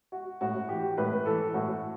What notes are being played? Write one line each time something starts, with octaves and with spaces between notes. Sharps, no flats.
F#4
A2 F#4
E3 G4
A2 B4
E3 A4
A2 F#4